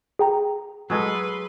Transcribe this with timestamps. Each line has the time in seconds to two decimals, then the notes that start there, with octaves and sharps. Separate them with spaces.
0.19 G#4 G5 A#5
0.90 F#3 G#3 A4 B4 C6